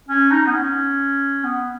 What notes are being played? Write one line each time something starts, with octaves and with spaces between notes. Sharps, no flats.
C#4
D#4
B3
C#4
B3